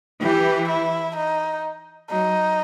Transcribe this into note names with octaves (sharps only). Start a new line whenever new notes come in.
E3 G4
E4
D#4
F#3 D#4